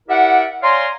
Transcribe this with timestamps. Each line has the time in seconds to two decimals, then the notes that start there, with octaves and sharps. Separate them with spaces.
0.09 E4 G4 A#4 D5 E5 F#5
0.63 C#5 D5 F5 G#5 A#5 C6